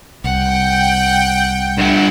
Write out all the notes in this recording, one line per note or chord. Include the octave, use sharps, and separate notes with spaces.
C2 F#5 G5
G2 E5 F#5